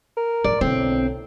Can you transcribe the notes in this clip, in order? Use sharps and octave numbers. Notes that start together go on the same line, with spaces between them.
A#4
A2 F3 D5
B1 A2 D3 C4